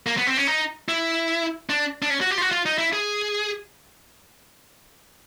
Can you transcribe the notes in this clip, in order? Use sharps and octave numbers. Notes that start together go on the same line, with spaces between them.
A#3
B3
C4
C#4
D#4
E4
D4
D4
C#4
F#4
G4
F4
F#4
F4
D#4
E4
G#4